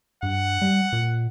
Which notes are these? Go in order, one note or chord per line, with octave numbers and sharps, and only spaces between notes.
G2 F#5
G3
A#2